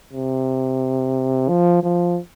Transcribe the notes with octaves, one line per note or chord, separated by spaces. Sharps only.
C3
F3
F3